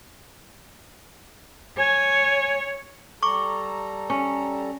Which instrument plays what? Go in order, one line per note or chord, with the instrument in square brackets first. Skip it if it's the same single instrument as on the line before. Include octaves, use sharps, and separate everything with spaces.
[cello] C#5 [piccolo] G#5
[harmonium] G3 A4 A#5 [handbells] C#6 D6
[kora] C#4